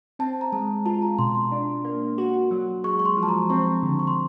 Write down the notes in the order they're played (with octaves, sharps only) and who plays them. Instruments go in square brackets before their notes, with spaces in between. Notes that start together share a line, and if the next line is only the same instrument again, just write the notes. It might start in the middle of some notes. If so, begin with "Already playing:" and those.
[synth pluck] C4 [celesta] A5
[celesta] A#5
[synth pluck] G#3 [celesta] A5
[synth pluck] F4 [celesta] A5
[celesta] A#5
[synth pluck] B2 [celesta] C6
[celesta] C6
[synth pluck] D4
A#3
F#4
F#3
[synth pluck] G#3 [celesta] C#6
[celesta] C#6
C6
[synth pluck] F3
[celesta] A5
A#5
[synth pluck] C4 [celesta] C#6
[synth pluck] D3
[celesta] C#6
C6